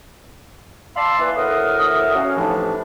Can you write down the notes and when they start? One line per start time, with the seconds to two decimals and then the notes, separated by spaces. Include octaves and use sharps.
0.96 D5 F5 A5 B5 C6 E6
1.19 E3 A#3 B4
1.36 D2 A2 A#4 E5 F#5 D#6
2.14 F#3 C#4 F5
2.36 A2 C3 E3 F3 D4 D#4